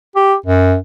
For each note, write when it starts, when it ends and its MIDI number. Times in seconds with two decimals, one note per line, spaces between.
0.16 0.35 67
0.46 0.76 42